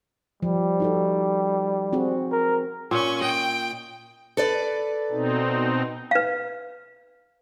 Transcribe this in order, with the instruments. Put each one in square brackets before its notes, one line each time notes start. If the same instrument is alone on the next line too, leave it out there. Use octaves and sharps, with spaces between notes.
[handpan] F3 [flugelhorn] G3
[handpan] D#4 F#4 A4
C4 F#4 G#4
[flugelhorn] A#4
[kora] A#2 [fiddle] C#4 C#6
[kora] D#5 [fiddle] G5
[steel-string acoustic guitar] A4 B4 D5
[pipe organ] B2 C4 D#4
[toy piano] B4 F5